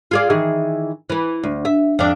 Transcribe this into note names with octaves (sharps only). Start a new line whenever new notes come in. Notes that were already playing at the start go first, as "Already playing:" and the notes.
F4 G#4 D5
D#3 E3 G#4
E3 B4
D2
E5
F2 D4